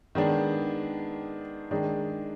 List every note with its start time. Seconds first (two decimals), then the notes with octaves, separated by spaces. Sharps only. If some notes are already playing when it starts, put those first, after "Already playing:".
0.15 D#3 G#3 B3 D4
1.71 D#3 G#3 D4